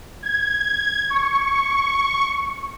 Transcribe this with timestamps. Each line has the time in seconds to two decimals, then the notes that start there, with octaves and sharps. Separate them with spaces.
0.23 G#6
1.10 C#6